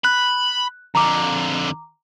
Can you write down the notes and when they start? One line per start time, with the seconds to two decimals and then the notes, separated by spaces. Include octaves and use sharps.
0.05 B5 F#6
0.95 F2 D3 A#5 D6